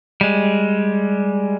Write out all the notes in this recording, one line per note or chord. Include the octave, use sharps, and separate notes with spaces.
G3 G#3